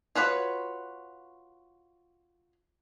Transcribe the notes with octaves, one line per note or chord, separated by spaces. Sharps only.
F4 F#4 B4 C#5